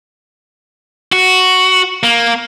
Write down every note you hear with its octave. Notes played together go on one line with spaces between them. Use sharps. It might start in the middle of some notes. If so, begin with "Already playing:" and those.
F#4
A#3